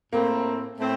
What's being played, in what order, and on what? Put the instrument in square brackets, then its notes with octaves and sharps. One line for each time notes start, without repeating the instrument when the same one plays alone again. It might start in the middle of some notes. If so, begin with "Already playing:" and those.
[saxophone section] A2 A3 C4 [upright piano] A#3
[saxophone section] A2 A3 C4